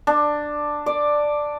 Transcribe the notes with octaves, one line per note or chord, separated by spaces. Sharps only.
D4
D5